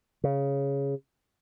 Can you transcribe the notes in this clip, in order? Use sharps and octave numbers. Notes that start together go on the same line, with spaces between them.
C#3